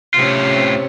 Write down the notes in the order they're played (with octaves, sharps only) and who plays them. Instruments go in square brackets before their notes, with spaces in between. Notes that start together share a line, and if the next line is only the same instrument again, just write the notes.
[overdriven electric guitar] A2 F4 [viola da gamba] C3 C4 C#4